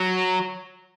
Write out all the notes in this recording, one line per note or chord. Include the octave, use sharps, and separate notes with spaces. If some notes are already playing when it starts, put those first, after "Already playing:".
Already playing: F#3